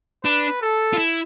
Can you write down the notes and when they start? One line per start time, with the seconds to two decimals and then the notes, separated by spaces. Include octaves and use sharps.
0.24 D4 B4
0.61 A4
0.93 F4
0.98 E4